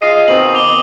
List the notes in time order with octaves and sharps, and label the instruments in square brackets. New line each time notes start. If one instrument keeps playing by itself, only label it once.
[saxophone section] F4 G#4 D#5 [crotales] D#6 C7 D#7
[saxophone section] B2 D#3 C4 [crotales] F#7
[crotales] D6 F7 G7